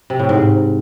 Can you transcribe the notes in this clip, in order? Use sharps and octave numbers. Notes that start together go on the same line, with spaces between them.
C3
A2
G#2